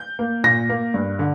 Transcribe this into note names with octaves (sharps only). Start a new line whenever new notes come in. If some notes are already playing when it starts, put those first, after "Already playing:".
Already playing: G6
A#3
A#2 A#6
A#3
G2
D3